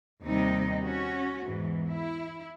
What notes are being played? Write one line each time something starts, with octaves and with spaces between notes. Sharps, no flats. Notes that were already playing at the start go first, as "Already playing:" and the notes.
D#2 C3 G3 D#4 D#5
C#4 F#4
E2 G#2 E3
E4